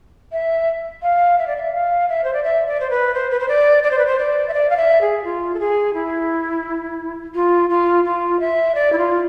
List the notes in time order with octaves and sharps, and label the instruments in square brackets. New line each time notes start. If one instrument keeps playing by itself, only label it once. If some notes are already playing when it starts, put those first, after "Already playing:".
[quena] E5
F5
E5
D5
E5
F5
E5
C5
D5
E5
D5
C5
B4
C5
B4
C5
D5
D5
C5
B4
C5
D5
E5
D5
F5
E5
G#4
F4
A4
G#4
E4
F4
F4
F4
E5
D5
E4
F4